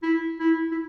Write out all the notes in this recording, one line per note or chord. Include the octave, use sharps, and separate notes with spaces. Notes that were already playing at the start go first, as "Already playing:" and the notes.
E4
E4
E4